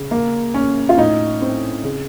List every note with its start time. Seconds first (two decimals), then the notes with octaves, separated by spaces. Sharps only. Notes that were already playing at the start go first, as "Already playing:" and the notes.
Already playing: C#3
0.11 A#3
0.54 C#4
0.89 F4
0.97 A2 D#4
1.42 C4
1.84 C#3